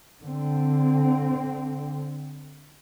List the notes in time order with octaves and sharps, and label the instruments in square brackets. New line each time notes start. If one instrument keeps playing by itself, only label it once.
[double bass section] D3 C4